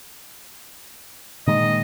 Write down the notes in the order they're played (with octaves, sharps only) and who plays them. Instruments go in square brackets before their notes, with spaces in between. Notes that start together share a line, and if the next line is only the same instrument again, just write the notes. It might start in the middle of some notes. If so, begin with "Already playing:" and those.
[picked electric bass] A#2 D#3 G#3 [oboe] D#5